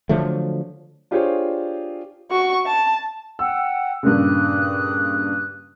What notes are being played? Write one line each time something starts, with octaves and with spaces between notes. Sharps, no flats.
D3 F3 F#3 A3
D4 F4 G4 G#4 C5 C#5
F#4 C#6
A5
F#5 G5 E6
G2 A#2 C#3 G4 D#6 F#6